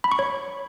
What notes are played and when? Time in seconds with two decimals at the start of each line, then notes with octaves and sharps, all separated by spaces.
0.04 B5
0.12 C#6
0.19 C#5